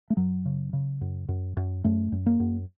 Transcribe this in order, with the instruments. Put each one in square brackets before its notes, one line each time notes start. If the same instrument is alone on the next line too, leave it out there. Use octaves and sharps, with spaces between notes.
[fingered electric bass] A3
F#2 F#3
C#3
C#3
F#2
F#2
F#2
F#2 A3
F#2
A#3
F#2